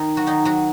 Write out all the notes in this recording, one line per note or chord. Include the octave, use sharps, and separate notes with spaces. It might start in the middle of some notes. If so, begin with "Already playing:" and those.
Already playing: D#3 D#4
F#3 F#4
D#3 D#4
F#3 F#4